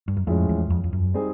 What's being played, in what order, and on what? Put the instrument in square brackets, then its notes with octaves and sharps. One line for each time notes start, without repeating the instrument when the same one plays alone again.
[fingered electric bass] G2
F#2
[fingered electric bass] F2 [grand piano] A2 F3 G#3 C#4
[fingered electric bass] E2
F2
F2
F#2
[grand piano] G3 C4 D#4 G#4